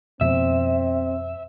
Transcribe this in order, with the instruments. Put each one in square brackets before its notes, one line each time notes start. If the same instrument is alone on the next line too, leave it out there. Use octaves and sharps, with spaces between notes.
[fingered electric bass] F2 B2 [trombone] C4 [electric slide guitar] E5